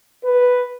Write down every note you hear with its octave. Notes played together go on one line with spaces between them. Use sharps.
B4